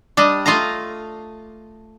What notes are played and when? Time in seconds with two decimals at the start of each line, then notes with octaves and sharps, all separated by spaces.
0.17 G3 D4 D#5
0.46 A3 F4 D#5 F5 A#5